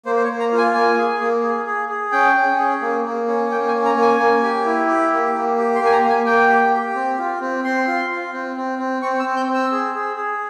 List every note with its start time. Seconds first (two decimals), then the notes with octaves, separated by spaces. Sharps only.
0.06 A#3 C5
0.16 C5
0.24 C#5
0.28 A#3
0.40 A#5
0.52 F4
0.58 G#5
0.74 A#3 G#5
0.98 G#4
1.21 A#3
1.43 G#4
1.66 G#4
1.89 G#4
2.12 C#4 G5
2.36 C#4
2.58 G#4
2.81 A#3
3.04 A#3
3.28 C#4
3.50 A#3 G5
3.68 G#5
3.74 C#4
3.85 A#5
3.96 A#3
4.02 G#5
4.19 A#3
4.43 G4
4.65 E4
4.88 G4
5.12 A#3
5.35 A#3
5.57 G4
5.75 C6
5.80 A#3 G#5
5.92 A#5
6.04 A#3
6.10 G#5
6.26 A#3 G5
6.49 G4
6.73 G4
6.95 C4
7.18 F4
7.41 C4
7.64 C4 C6
7.87 F4
8.10 F4
8.33 C4
8.56 C4
8.79 C4
9.02 C4 C#6
9.20 E6
9.25 C4
9.37 G6
9.48 C4
9.54 E6
9.72 G#4
9.95 G#4
10.17 G#4